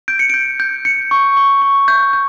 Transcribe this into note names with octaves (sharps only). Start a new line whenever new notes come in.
G6 D7
C#7
G6 D7
G6
G6 C#7
C#6
C#6
C#6
G6
G6